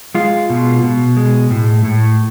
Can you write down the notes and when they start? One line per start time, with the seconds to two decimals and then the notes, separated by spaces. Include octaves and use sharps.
0.15 G#3 F4
0.50 B2
0.83 B2
1.17 G#3
1.50 A2
1.85 A2